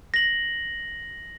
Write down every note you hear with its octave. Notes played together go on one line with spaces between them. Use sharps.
A#6 F#7